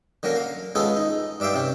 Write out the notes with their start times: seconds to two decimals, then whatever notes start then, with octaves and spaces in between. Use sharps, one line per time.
0.23 D3 F#3 A#3 C#4 A#4
0.36 F5
0.75 G#3 B3 C#4 F4 G#4 A4
0.96 D#4
1.40 G2 D5 E5 F5 G5
1.54 C3 C#4